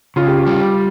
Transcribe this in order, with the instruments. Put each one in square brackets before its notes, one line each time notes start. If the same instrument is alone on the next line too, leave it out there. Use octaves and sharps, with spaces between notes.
[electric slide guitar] C#3 [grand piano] F4
[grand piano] G4
F4
[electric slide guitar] G3